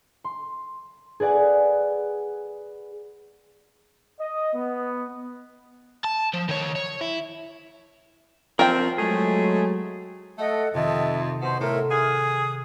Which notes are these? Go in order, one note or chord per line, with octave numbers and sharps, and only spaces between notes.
C6
G#4 B4 D5 F#5 G#5
D#5
B3
A5
F3
D#3 C#5
C#5
E4
F3 C4 A#4 G5
F#3 G#3 A3 G#4
A3 A4 D#5 F#5
F2 C3 D#3 D#5 E5 A5
B2 C5
A2 A4 A#4 C5 E5
G#4 F#5 D#6 F6 G#6